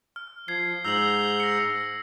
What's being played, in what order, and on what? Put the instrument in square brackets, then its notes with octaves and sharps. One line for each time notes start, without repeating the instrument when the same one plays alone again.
[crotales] F6
[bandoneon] F3 [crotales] G#6 C7
[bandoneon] G#2 A#5 G6 [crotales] E6 F#7
[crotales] A#6 C#7